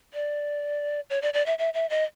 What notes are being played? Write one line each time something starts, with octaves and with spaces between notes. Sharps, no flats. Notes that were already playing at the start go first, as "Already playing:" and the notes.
D5
C#5
D5
D5
E5
E5
E5
D#5